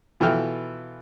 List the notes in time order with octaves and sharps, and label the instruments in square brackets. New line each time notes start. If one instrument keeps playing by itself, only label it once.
[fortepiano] B2 E3 F4 A4 G5 F6